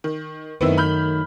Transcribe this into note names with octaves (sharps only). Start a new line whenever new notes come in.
D#3
F#2 D#3 A3 B3 C4 E4
B5 F6 G6